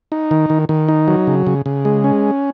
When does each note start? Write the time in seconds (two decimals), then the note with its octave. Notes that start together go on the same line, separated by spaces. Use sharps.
0.12 D#4
0.31 D#3
0.50 D#3
0.69 D#3
0.89 D#4
1.08 F#3
1.27 C#3
1.47 C#3
1.66 C#3
1.85 G#3
2.04 C#4